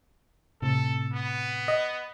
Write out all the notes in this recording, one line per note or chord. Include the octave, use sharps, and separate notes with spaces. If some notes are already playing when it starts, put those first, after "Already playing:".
A2 C3 A4
B3
D#5